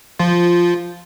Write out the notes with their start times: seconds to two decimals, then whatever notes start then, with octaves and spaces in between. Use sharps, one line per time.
0.19 F3 F4